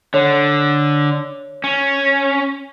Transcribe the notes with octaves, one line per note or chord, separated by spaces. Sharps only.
D3 C#5
C#4